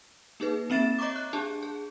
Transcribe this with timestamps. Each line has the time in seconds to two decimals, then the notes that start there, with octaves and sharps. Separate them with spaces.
0.40 A#3 D#4 G#4 B4
0.70 A#3 C4 E5 A6 E7
0.98 C#5 D#5 A#5 C#6 D6
1.16 F#6
1.33 D4 G4 G#4 A5
1.63 G#4